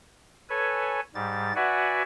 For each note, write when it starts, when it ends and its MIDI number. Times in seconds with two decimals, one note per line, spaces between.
0.50 1.00 69
0.50 1.00 71
0.50 1.00 73
0.50 1.00 80
1.15 1.53 44
1.15 1.53 55
1.15 1.53 93
1.56 2.03 66
1.56 2.03 71
1.56 2.03 74
1.56 2.03 76
1.56 2.03 78
1.56 2.03 80